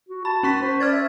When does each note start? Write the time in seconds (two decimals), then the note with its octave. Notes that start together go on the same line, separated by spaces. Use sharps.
0.09 F#4
0.25 A5 B5
0.43 C#4 C#6 B6
0.62 C5
0.80 D5 F6 G#6 A6
0.92 E5